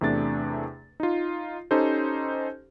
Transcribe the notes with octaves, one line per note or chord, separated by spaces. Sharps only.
E2 C3 A3 D4 A6
D#4 F4
C#4 D#4 G4 A4 C5